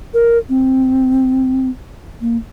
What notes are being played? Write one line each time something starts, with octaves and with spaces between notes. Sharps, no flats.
A#4
C4
A#3